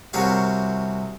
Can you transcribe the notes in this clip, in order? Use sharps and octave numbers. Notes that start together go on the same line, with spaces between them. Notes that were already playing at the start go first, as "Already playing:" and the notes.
C2 C3 F#4 A#4 C#5 F5